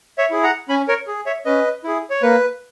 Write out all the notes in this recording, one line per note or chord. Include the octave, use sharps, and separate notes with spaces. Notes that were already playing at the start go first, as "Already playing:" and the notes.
C#5 E5
E4 G#4
F#5 A#5
C#4 G#5 B5
A#4 C#5
G#4
C#5 E5
C#4 B4 D#5
E4 G#4
C#5
A#3 B4